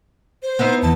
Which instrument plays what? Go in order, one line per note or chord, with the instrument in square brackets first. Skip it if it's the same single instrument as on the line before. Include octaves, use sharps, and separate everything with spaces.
[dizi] C5
[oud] B3 D#4 E4
[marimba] E2 E3 [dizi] A5